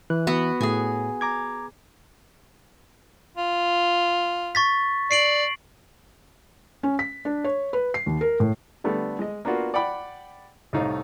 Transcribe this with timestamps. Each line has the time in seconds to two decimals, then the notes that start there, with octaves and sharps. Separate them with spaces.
0.10 E3 F#6
0.27 B3 F#4
0.61 A2 G#4 G#5
1.21 A#5 D6 G#6
3.37 F4
4.55 C#6 A6 B6
5.11 D5 C7 D7 F#7
6.83 C#4
6.99 B6
7.25 D4
7.44 C#5
7.73 B4
7.94 C7
8.06 D#2
8.21 A#4
8.40 A2
8.84 D3 G3 A3 B3
9.19 G#3 D#5
9.45 A#3 B3 D4 F4 F#4
9.74 D5 F#5 G5 B5 D6
10.73 C2 A2 A3 D#4 F5